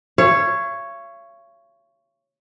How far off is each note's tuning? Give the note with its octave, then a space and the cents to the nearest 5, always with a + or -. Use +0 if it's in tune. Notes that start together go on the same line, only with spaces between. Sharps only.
C#5 +0 F5 -45